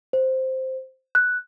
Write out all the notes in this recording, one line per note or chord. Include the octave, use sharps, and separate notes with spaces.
C5
F#6